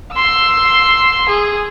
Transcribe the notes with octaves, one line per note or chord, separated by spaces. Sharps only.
C6 E6
G#4